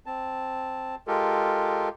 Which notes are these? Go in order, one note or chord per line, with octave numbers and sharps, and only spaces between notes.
C4 A5
G#3 F4 G4 A4 A#4